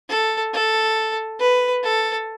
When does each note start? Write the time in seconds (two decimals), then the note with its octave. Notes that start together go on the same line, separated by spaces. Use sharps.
0.09 A4
0.53 A4
1.40 B4
1.83 A4